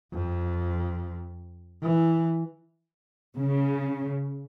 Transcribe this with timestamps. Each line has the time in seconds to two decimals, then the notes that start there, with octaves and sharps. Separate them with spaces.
0.13 F2
1.82 E3
3.39 C#3